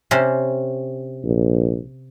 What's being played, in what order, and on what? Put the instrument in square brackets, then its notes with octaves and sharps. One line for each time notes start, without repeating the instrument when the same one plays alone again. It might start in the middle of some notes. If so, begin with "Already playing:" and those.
[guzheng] C3 C#4 C5
[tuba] A#1